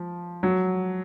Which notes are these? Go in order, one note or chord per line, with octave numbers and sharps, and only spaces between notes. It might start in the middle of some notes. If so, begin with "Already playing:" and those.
Already playing: F3
F#3